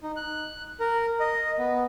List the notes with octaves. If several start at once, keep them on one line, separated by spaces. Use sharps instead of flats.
D#4
F#6
A#4
D#5
B3